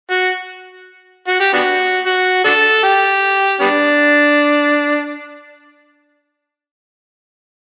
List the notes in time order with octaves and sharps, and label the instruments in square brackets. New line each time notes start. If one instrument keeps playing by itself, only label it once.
[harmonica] F#4
F#4
G4
B3 D4 F#4
F#4
D4 F#4 A4
G4
G3 B3 D4